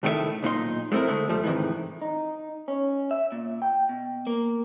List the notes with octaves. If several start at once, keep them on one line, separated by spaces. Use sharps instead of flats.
C2 A2 D#3 A3 G4 E5
B1 A#2 D#4 C6
G#3 A3 C4 E4 A#4
D3 G#3 A3
F#2 F3 G3 A3
G#2 C3 D#3 E3
D#4
C#4
E5
A#2
G5
B2
A#3